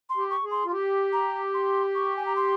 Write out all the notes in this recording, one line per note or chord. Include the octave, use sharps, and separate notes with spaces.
C6
G4
C#6
G#4
C6
F4
G4
A#5
C6
C#6
G#5
A#5
C6